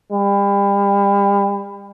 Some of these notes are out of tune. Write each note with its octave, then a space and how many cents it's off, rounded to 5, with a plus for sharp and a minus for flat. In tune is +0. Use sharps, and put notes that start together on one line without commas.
G3 +35